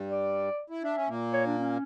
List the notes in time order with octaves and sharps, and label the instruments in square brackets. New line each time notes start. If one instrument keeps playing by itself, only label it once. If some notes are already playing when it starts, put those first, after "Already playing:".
Already playing: [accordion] G2 G3
[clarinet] D5
[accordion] E4
[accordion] D4 [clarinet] E5
[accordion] C#4
A#2 A#3
[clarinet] C#5
D4
C#4